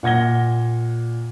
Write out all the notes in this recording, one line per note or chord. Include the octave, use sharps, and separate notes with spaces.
A#2 F#5 G#6 A#6 G7